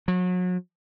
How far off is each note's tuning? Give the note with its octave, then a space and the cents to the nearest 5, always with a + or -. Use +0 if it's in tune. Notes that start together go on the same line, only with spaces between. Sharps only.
F#3 -35